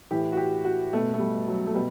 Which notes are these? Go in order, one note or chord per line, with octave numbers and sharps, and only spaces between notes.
A2 E3 G4
F#4
G4
F#4
B2 A3
A3
G3
F#3
A3
B2 G3